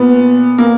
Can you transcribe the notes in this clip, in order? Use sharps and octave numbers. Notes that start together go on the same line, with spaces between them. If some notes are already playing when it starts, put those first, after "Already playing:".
Already playing: A#2 B3
A#3